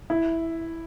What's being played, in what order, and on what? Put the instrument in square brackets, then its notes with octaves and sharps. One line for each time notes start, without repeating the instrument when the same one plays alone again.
[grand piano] E4